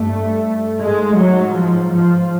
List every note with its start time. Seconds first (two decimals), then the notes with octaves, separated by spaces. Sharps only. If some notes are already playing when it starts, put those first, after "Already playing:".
Already playing: G2 A3
0.80 G#2 G#3
1.18 F#3
1.56 F3
1.93 F3